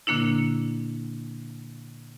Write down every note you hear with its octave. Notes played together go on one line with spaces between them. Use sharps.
A#2 D3 A#3 D4 E4